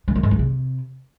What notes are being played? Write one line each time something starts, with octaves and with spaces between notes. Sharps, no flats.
D3
D#3
G#2
E2
C3